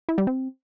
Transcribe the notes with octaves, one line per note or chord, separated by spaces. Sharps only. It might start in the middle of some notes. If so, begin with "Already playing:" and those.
E4
G3
C4